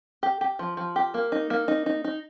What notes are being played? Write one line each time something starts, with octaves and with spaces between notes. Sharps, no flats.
G4
G4
F3
F3
G4
A#3
D#4
A#3
D#4
D#4
D#4